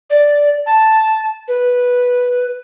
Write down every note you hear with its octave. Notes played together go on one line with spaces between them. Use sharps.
D5
A5
B4